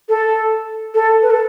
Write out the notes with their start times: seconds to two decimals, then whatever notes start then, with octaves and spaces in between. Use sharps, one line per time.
0.09 A4
0.94 A4
1.22 B4
1.30 A4